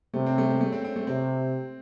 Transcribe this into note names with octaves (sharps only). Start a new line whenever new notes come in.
C3 A3
C4
A3
G#3
A3
C4
C4
A3
C3 C4